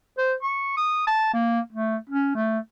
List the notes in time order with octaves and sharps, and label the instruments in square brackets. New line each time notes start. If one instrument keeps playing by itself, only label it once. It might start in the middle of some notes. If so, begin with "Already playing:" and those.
[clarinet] C5
C#6
D#6
A5
A#3
A3
C#4
A3